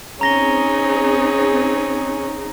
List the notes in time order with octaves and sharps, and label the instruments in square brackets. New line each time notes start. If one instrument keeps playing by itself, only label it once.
[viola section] C4 D#4 G#4 [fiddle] C#4 [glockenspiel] A#5 A#6 G7